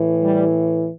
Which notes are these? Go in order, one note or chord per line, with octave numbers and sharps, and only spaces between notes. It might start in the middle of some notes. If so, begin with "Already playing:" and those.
Already playing: A2 E3
G3